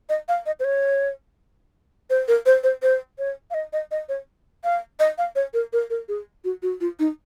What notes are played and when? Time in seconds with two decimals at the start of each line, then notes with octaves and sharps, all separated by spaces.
0.09 D#5
0.29 F5
0.46 D#5
0.60 C5
0.64 C#5
2.10 C5
2.28 A#4
2.46 C5
2.63 C5
2.82 C5
3.19 C#5
3.51 F5
3.54 D#5
3.73 D#5
3.91 D#5
4.09 C#5
4.64 F5
5.00 D#5
5.18 F5
5.35 C#5
5.54 A#4
5.73 A#4
5.90 A#4
6.08 G#4
6.44 F#4
6.62 F#4
6.81 F4
6.99 D#4